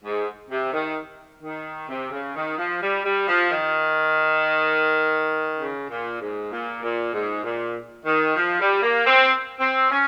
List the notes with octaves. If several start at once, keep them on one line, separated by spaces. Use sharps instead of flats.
G#2
C3
D#3
D#3
C3
C#3
D#3
F3
G3
G3
F3
D#3
C#3
A#2
G#2
A#2
A#2
G#2
A#2
D#3
F3
G3
A#3
C4
C4
C#4